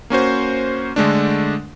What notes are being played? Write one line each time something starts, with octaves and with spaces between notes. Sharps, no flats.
A#3 C#4 F#4 C5
D3 G#3 A3 D4